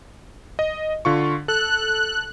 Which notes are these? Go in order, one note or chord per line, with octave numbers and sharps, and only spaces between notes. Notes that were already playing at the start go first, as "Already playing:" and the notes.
D#5
D3 F4 C#6
A4 F#6